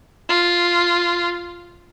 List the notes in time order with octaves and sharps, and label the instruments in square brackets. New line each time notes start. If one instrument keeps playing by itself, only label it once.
[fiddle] F4